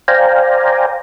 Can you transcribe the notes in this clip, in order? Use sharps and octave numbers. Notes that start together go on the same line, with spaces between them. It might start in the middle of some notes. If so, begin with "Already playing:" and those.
C5 D5 F5 G5 G#5 A#5